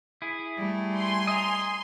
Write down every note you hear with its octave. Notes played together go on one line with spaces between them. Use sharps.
E4 G#4
G3 A3
G#5 C6
D#5 A#5